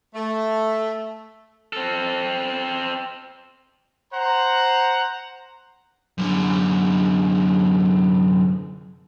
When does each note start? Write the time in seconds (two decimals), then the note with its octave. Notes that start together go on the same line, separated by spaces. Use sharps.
0.14 A3
1.73 C4 A4
4.13 C5 F#5 A#5
6.18 F#2 D3